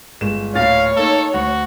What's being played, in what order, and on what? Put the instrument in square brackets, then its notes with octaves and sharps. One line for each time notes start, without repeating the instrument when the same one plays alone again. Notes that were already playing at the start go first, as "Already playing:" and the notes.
[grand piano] G1 G#3 E7
[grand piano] D1 A#2 A6 [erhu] C#5 [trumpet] F5
[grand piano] A#3 D#4 [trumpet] A4
[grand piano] D2 [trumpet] F#4